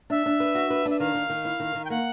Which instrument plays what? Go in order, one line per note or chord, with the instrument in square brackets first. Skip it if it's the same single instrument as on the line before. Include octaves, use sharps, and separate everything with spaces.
[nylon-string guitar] D4 [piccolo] E5
[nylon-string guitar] D4
B4
F#4
B4
[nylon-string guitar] D4 [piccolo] E5
[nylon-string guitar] D#3 [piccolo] F5
[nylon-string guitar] D#3
D#3
E4
D#3
D#3
[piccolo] G5
[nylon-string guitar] A#3 [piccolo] F#5